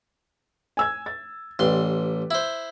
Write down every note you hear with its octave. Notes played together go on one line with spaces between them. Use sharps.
G#5 E6 G#6
A6
A1 G4 B4 D5 C6
E4 C5